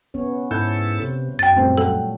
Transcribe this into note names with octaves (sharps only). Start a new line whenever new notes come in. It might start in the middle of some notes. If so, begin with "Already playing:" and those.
B3 C#4 C#5
G#2 E4 A4 G6
C3
F#2 G5 A6
A#2 G3 A3 C4
F#3 A4 F#5 G5